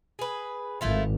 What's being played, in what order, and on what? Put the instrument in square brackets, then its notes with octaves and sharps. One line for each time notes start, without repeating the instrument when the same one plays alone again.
[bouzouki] G#4 B4
[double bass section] G#1 [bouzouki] A3 E4 F4